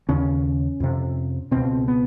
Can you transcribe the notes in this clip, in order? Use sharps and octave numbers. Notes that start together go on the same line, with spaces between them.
D#2 C#3 C#4
F2 C3
C#2 B2 C4
B3